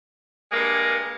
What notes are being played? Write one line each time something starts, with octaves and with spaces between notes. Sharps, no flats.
G2 G#3 A#3